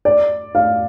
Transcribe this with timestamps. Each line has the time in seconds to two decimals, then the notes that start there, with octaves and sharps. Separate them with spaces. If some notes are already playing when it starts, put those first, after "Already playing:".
0.05 D5
0.55 F5